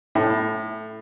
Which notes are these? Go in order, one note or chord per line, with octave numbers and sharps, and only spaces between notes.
A2